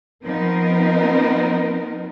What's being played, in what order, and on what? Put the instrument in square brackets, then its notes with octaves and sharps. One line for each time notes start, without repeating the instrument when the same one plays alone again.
[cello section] F3 B3 C4 D#4 A#4